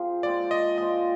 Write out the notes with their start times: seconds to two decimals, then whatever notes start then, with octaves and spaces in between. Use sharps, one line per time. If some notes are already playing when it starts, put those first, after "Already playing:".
Already playing: F3 C4 F4 G#4
0.23 A#2 G#3 C4 D5
0.51 D#5
0.78 A#2 G#3 C4 D#5